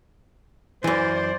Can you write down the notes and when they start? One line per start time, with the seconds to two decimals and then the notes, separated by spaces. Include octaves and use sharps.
0.84 F#2 E3 C5 D5